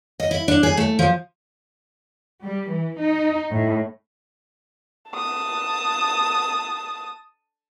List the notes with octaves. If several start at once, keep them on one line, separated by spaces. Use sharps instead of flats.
D#5
E4
D4
G#4
A3
F3
G3
E3
D#4
A2
A5 D#6